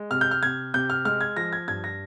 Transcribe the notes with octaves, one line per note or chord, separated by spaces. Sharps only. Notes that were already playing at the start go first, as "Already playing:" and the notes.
Already playing: G#3
C3 F6
G6
F6
C3 G#6
C3 G6
F6
G#3 F6
G#6
F3 A#6
G#6
G2 G#6
A#6